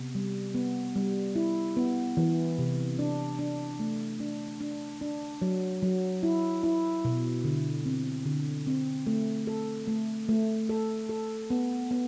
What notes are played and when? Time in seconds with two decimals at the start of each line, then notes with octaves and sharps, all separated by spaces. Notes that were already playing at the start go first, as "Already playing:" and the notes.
Already playing: C3 B3
0.15 G3
0.55 B3
0.96 G3
1.36 E4
1.77 B3
2.17 E3
2.58 C3
2.99 D4
3.39 D4
3.80 A3
4.20 D4
4.60 D4
5.01 D4
5.42 F#3
5.82 F#3
6.23 E4
6.64 E4
7.05 B2
7.44 D3
7.86 C4
8.26 D3
8.67 C4
9.07 A3
9.47 A4
9.87 A3
10.29 A3
10.69 A4
11.09 A4
11.50 B3
11.91 B3